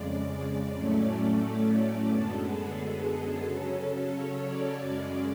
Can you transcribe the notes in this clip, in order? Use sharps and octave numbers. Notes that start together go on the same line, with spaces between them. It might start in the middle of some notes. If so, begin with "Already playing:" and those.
Already playing: F2 C#3 G#3 D5
A2 F#3 A3 C#4
F#2 D3 G#3 B3 A4
G#4
A4
C#3 F#3 C#4
C#5
D5
F#2 C#3 G#3 C#4 D5